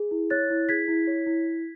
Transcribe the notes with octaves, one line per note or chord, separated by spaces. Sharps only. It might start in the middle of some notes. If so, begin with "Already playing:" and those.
Already playing: G#4
E4
C#5 F#6 A6
E4
G#4 G#6 B6
E4
C#5
E4